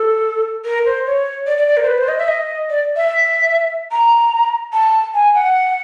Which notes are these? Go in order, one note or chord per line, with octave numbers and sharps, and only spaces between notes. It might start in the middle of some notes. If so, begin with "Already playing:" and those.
Already playing: A4
A#4
C5
C#5
D5
D5
D5
A#4
C5
B4
C5
D#5
E5
D#5
D5
E5
A#5
A5
G#5
F#5